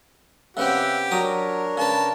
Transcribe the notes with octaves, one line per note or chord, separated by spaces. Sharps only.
C#3 B3 C4 G4 E5 F#5
F#3 D4 A#4 C#5 A#5 D#6
C#3 B4 A5